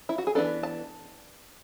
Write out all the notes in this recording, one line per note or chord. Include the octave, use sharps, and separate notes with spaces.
E4
F#4
G#4
E3 G#3 B3 D4 A4
A5